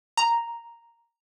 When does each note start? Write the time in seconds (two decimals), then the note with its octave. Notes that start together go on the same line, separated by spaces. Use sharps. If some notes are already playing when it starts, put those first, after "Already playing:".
0.17 A#5